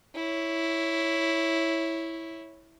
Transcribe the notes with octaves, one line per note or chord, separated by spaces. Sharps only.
E4 C#5